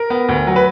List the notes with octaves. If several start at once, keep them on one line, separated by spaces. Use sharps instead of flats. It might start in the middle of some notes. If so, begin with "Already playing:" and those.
Already playing: A#4
B3
D2
F#3
B4